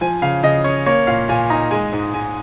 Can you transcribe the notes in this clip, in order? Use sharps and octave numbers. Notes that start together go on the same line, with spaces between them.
F3 G#5
C#3 F5
C#3 D#5
C#4 C#5
A#3 C#5
A#2 F5
A#2 G#5
D#4 A#5
G#3 G#5
G#2
G#2 G#5